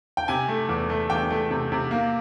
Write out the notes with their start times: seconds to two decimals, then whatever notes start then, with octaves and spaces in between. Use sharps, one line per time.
0.17 G5
0.28 C3 G#5
0.48 A3
0.69 E2
0.90 A3
1.10 E2 G5
1.30 A3
1.51 C3
1.72 C3
1.91 A#3